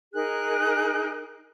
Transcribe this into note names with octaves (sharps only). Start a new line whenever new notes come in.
D#4 G#4 A#4 F#6